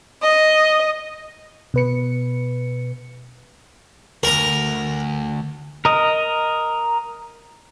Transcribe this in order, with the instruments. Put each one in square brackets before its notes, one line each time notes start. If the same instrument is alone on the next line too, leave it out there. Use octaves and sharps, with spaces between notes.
[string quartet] D#5
[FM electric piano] B2 B4 C#7
[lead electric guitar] D2 [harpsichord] A#4 A#5
[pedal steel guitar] A#4 D#5